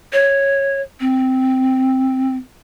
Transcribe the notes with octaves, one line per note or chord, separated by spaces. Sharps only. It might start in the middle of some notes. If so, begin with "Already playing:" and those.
C#5
C4